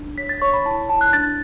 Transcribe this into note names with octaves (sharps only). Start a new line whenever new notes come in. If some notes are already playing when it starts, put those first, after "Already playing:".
Already playing: D4
C#5 B6
A6
C#5 C#6
B5
E4 A5
E4 A5
F#6
D4 A6